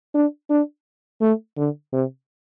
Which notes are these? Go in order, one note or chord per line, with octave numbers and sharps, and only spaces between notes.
D4
D4
A3
D3
C3